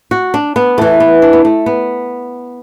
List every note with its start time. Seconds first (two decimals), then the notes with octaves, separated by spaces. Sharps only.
0.11 F#4
0.34 D4
0.56 B3
0.78 E2 E3 A3
1.00 B3
1.22 D4
1.33 B3
1.45 A3
1.66 B3